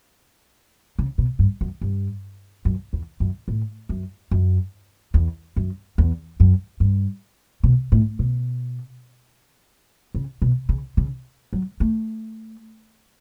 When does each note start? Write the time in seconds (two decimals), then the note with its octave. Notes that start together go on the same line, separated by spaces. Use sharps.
0.99 C#3
1.18 B2
1.39 G2
1.61 F#2
1.81 G2
2.65 F#2
2.93 E2
3.20 F#2
3.48 A2
3.89 F#2
4.31 F#2
5.14 E2
5.56 F#2
5.98 E2
6.40 F#2
6.80 G2
7.64 B2
7.92 A2
8.19 B2
10.15 C#3
10.42 B2
10.69 C#3
10.97 C#3
11.53 F#3
11.80 A3